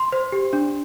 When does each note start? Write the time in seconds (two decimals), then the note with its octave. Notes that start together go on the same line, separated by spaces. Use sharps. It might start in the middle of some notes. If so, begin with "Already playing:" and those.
Already playing: C6
0.12 C5
0.32 G4
0.53 D4